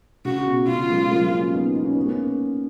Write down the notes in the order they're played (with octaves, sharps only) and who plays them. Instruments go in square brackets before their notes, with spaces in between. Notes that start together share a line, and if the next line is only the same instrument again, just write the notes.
[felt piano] C#3 [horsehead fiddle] F#4
[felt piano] B2
[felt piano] C#3 [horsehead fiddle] F4
[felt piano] F3 G#3
F#3 A#3
C#4 F4
B3 D#4
D#4
C#4
B3
A#3 C#4